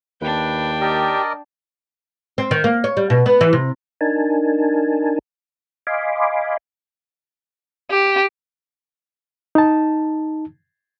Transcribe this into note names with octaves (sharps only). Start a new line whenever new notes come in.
D#2 D4 B4 G5
G4 A#4 D5 D#5
C4
D#3
A#3
C#5
G3
B2
B3
E3
C3
D4 D#4 A#4 G#5 A5
D#5 F5 G#5 B5 C6 D6
G4
D#4 A5